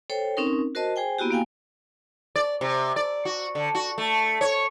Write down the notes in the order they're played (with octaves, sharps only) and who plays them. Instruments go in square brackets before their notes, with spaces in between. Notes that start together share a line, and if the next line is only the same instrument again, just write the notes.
[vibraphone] A4 C5 C#5 G5
C4 C#4 D#4 A#4
F#4 A#4 C5 D#5 A5
G#4 C5 G5 G#5
A#3 B3 E4 F#4 G4
A#3 F5 G5 G#5
[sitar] D5
C3
D5
F#4
D3
F#4
A3
C#5